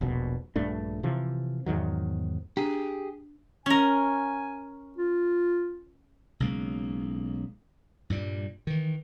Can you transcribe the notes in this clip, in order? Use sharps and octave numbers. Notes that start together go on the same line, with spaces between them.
E1 A#1 B2
A#1 G2 A3 D4
C3 E3 F3
E2 G#2 D#3 F#3
D4 G4 G#4
C#4 A#4 G#5
F4
B1 C#3 G#3 A#3
G2 A#2 G3
D#3 E3